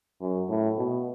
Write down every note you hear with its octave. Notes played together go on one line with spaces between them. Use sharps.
F#2
A2
B2